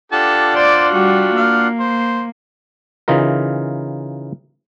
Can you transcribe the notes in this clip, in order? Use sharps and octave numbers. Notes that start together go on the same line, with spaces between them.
D4 F4 G4 A4 F#5 A5
C5 D5
G3 F#4 G4
A#3 F5
C5
C#3 E3 D#4 F4 A#4